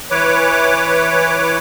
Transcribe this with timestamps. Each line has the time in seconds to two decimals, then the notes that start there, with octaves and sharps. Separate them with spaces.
0.11 E3 B4 C#5 D6